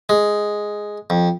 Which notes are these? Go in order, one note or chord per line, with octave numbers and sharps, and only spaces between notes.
G#3
F2